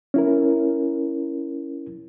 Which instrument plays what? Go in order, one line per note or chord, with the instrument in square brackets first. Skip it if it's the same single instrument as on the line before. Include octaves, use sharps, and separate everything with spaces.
[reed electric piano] C#4 E4 A#4